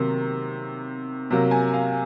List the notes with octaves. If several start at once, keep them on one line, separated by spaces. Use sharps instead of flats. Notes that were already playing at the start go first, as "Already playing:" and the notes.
Already playing: C3 D#3 F#3 A#3
C3 F#3 A#3
G#5
F5